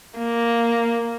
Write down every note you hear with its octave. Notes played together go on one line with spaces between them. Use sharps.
A#3